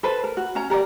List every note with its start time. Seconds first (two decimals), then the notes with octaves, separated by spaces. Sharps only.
0.03 A4 B4 C5
0.24 A#4
0.37 F#4
0.55 C#4 A#5
0.70 G4 A#4 C5 D5